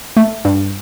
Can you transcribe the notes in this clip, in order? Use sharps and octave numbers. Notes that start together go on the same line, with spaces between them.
A3
G2